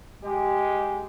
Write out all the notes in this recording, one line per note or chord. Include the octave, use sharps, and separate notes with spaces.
G#3 G4